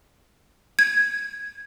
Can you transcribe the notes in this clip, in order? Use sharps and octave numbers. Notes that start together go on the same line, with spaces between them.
G#6